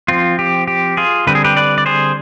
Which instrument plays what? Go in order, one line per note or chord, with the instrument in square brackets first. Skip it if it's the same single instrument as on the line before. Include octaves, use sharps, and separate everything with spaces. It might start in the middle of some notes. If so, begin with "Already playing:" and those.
[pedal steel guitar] F3 C4 F4
G4
G4
F4 G#4
D3 G3 C4 B4
G#4
G4 B4
B4 D5
D5
G#4 C5